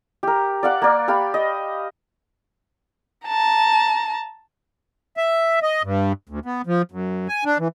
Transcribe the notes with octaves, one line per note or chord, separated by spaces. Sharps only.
G4 A#4
D5 F5 F#5 D6
A#3 D5
G4 F5 B5
D#5
A5 A#5
E5
D#5
G2
D2
B3
F3
F#2
G#5
D4
E3